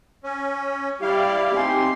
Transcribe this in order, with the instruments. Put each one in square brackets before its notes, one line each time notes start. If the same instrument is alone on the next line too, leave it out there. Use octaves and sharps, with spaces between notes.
[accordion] C#4
[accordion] G3 E4 F5 [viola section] G4 D5
[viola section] C4 C6 [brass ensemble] D#4 G4 G#5